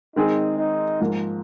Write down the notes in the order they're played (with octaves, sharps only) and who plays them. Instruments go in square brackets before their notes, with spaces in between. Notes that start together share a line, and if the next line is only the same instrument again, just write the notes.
[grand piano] D#3 G#3 C4 G#4 [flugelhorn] D#4
[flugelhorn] D#4
[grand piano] G#2 F3 A#3